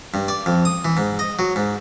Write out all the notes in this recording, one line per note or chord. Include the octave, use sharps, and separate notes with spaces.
G2
D5
F2
D#6
E3
G#2
D#5
F#3
G#2